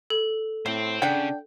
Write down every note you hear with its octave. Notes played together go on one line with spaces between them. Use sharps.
A4
A2 C5 E5 G5
C#3 D4 F#5 G5